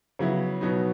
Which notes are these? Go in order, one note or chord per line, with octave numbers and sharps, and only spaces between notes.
C#3 F#3 B3 E4
B2 F#3 B3 D#4